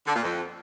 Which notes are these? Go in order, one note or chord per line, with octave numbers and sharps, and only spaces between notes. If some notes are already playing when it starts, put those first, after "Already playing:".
D3
A#2
F2